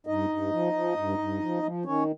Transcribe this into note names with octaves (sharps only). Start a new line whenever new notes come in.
G2 D#4 D#5
G2
F3
F3
G2
G2
F3
F3
D#3 C#4 C#5